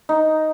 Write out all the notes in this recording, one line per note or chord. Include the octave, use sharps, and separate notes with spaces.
D#4